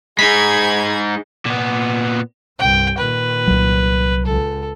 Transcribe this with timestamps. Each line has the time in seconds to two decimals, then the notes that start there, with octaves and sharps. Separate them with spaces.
0.19 G#3 D#4 G#4 B5 G#6 B6
1.46 A#2 B3
2.59 C2 G2 G5
2.98 A#2 D#3 B4
3.47 C2 F#3
4.26 C#2 A4